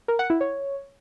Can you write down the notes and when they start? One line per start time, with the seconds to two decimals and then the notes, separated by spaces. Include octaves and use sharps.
0.08 A#4
0.19 F#5
0.30 E4
0.41 C#5